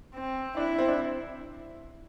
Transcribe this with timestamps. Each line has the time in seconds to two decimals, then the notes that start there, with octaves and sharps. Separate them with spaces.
0.14 C4
0.57 D4 E4
0.78 C4
0.88 D4